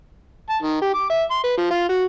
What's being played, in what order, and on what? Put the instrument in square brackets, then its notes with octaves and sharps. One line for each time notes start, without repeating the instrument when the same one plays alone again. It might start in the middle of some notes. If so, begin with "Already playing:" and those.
[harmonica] A5
D#3
G4
D6
E5
C6
B4
F3
F4
F#4